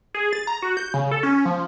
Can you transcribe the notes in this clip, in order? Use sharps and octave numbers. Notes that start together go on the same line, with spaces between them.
G#4
A6
A#5
F#4
G6
C#3
A4
C#4
F3